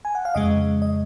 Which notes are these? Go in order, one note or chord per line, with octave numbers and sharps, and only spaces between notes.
G#5
F#5
F5
F2 C#3 G#3 D#5
D#5